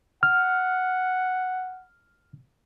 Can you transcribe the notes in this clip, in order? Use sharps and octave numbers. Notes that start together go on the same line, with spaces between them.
F#5 F6